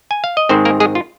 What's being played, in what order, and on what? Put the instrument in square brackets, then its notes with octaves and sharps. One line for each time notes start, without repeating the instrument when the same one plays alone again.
[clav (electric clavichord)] G#5
F5
D#5
G#2 D#3 G#3 C4 C5
A#3 A#4
G#3 G#4
F4